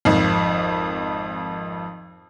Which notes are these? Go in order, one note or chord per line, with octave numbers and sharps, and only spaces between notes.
G#1 F2